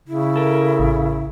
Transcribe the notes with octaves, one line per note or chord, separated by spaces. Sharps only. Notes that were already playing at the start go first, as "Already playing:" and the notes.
C#3 E4
A4 A#4
A1